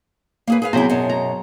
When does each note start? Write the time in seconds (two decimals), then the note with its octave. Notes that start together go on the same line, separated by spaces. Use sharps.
0.47 A#3 G#4 B4
0.62 G#4 B4 F5
0.73 C3 F#3 B3 E4 G#4 C5 C#5
0.90 F#2 B2
1.09 A#5